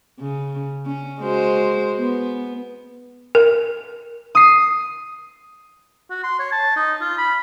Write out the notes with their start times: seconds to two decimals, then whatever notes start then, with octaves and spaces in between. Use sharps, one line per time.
0.19 C#3
0.85 C#4
1.21 G#3 F#4 C5
1.98 B3
3.35 A#4
4.35 D#6 C7
6.10 F#4
6.24 C6
6.39 C#5
6.52 A5
6.76 D#4
7.01 F4
7.18 B5